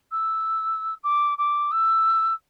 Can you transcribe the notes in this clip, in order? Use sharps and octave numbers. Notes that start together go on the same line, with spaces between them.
E6
D6
D6
E6